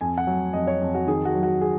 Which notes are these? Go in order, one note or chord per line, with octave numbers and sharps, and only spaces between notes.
F2 G#5
F#5
F#3
F2 D#5
C#5
F2
F#4
D#3 G#4
F#4
F#3
F#4
G#4